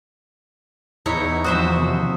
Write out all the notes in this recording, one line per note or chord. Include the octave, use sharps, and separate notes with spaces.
E2 D#4 E4 C#5
F3 F#3 C4 F#4 C5 E5 D#6
D#2 C3 F3